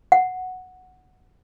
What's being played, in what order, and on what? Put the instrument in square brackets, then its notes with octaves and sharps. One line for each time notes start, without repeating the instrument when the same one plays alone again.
[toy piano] F#5